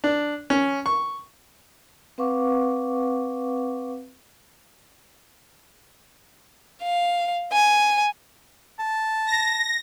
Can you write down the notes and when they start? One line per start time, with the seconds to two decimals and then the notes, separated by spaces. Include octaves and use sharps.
0.04 D4
0.50 C#4
0.86 C#6
2.18 C4 B4 F5 F#5 C#6 D6
6.83 F5
7.53 G#5
8.79 A5
9.27 A#6